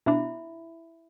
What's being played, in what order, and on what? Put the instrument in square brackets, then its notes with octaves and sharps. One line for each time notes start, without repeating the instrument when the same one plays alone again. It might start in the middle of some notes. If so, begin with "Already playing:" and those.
[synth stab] B2 D4 [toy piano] E4 E5 B5